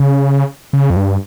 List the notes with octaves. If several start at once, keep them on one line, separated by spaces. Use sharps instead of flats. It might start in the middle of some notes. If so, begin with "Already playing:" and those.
Already playing: C#3
C#3
F2
G2